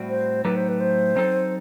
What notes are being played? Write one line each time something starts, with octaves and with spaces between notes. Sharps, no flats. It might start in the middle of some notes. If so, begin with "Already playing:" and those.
Already playing: A2 G3 C4 F#4
C5
A2 F#3 A3 D#4 G4 B4
C5
B4
C5
F#3 C4 D#4 A4